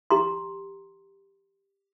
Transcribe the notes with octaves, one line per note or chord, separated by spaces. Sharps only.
G4 A#5 C6